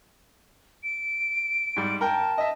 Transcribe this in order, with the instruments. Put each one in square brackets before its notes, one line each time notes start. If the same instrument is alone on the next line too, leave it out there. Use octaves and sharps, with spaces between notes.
[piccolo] D7
[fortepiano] G#2 G3
[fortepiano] A#4 G5 [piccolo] A5
[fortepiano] D#5 E5